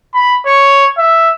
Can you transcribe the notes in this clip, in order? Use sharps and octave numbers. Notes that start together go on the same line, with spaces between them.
B5
C#5
E5